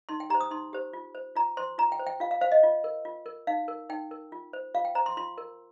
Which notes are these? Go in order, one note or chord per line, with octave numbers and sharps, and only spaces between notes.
D#4 C6
G5
G4 C5 A#5
D#6
D#4 C6
G4 C5
F4
C5
F4 A#5
C5 C6
F4 A#5
G5
C5
G5
F4 F5
F5
C5 F5
D#5
F4
A#4
F4
A#4
D#4 F5
A#4
D#4 G5
A#4
F4
C5
F4 F5
G5
C5 A#5
C6
F4 C6
A#4